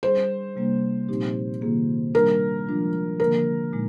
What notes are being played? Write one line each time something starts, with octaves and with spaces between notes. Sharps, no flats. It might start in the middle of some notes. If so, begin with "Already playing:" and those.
G3 D4 G#4 C5
C3 G3 A#3 D4
A#2 F3 C4 D#4 G4
C3 D#3 A#3 F4 G#4
D#3 G3 D4 A#4
F3 G#3 D4 F4
D3 F3 A#3 A#4
A#2 G#3 D#4